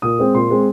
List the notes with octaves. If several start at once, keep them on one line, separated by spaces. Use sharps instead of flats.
A#2 D#6
G#3 C4
A#2 C6
G#3 C4